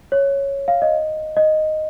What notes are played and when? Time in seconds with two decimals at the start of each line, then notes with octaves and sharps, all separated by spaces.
0.12 C#5
0.68 F5
0.82 D#5
1.36 D#5